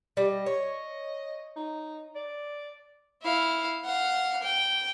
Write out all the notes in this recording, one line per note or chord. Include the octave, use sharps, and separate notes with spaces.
G3 D#5
C#5
D#4
D5
E4 F5
F5 F#5
G5